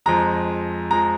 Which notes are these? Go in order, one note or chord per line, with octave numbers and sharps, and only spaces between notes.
F2 F3 G#3 A#5
F3 G#3 A#5